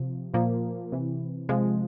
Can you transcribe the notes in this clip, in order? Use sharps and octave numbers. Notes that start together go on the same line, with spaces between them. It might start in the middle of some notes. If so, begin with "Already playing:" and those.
Already playing: C3 F3
A#2 F3 A#3
C3 E3
C3 F3 G#3